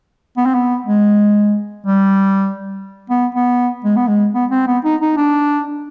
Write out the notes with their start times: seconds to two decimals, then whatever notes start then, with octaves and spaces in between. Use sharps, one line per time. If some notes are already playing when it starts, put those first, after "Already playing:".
0.37 B3
0.45 C4
0.55 B3
0.86 G#3
1.86 G3
3.10 B3
3.35 B3
3.85 G#3
3.96 B3
4.08 G#3
4.34 B3
4.51 C4
4.67 B3
4.84 D#4
5.01 D#4
5.17 D4